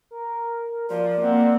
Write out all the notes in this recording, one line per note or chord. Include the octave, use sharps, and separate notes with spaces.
A#4
F3 D5
A#3 C4 F#5